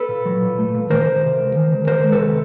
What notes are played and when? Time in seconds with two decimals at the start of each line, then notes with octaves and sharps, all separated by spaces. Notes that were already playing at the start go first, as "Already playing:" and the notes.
Already playing: A4 B4
0.09 A#2
0.26 F#3
0.42 A#2
0.58 A3
0.75 A#2
0.90 D#3 A#4 C5
1.06 C#2
1.23 C3
1.39 C#2
1.56 D#3
1.71 C#2
1.87 D#3 A#4 C5
2.04 G#3
2.12 A4 B4
2.20 C3